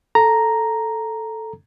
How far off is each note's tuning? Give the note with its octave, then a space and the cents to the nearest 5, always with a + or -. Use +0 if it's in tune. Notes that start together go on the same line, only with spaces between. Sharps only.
A4 +0 A#5 +0